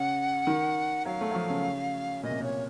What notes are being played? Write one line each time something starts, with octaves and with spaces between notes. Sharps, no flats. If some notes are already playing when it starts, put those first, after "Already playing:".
Already playing: C#3 F#5
D#3
F#3 F5
A3
F#3
F3
C#3
A#2 D#5
C3
A#2 C#5